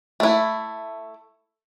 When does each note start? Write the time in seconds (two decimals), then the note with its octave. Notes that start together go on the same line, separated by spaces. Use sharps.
0.20 A3 E4